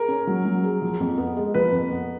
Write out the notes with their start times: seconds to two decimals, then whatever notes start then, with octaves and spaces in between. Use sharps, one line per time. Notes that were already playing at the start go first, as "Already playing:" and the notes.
Already playing: G#4 A#4
0.08 C#4
0.27 F#3
0.45 F#3
0.64 G#4
0.82 F3
1.00 F2
1.18 B3
1.36 G#3
1.54 F3 B4
1.72 F2
1.91 B3